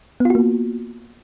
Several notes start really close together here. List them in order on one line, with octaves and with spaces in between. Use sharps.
B3 F4 F#4 A#3